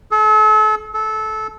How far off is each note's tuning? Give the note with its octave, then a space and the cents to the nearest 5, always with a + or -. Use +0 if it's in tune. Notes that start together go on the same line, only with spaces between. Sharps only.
A4 -40
A4 -20